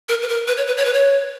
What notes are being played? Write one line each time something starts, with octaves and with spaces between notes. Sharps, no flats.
A#4
B4
A#4
B4
C#5
B4
C#5
B4
C#5